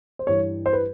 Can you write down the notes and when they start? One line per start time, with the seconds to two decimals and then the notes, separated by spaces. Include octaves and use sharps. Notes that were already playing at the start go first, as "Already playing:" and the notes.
0.19 C5
0.27 G2 E3 G3 C#5
0.66 C5
0.73 B4